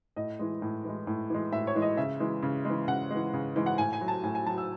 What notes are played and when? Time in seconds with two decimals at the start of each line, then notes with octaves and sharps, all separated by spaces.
0.16 A2 D#5
0.39 E3 G#3
0.62 A2
0.85 E3 G#3
1.07 A2
1.30 E3 G#3
1.52 A2 E5
1.67 C#5
1.75 E3 G#3
1.82 D#5
1.97 C#3 E5
2.20 E3 G#3
2.43 C#3
2.65 E3 G#3
2.88 C#3 F#5
3.10 E3 G#3
3.33 C#3
3.56 E3 G#3
3.66 F#5
3.78 A2 G#5
3.93 G#5
4.01 F#3
4.08 A5
4.23 A2 G#5
4.35 G#5
4.46 F#3 A5
4.58 E6